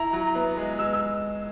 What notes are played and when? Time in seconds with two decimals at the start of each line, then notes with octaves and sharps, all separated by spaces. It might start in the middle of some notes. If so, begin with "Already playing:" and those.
Already playing: E4 A#5
0.13 F#3 A#5
0.35 B3
0.57 G#3
0.79 G#3 E6
0.93 E6